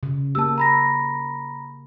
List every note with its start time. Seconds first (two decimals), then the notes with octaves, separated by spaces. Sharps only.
0.03 C#3
0.35 A#3 G4 A5 E6
0.58 A#5 B5 A#6